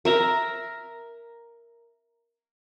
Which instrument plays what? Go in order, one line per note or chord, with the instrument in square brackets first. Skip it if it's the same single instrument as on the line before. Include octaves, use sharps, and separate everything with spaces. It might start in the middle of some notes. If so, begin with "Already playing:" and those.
[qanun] A#4 E5 A#5